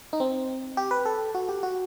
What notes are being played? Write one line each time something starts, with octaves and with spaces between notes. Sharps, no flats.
D#4
C4
G4
B4
A4
F#4
G4
F#4